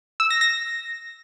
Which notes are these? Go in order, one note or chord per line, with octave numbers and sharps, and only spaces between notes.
E6
A#6
A#6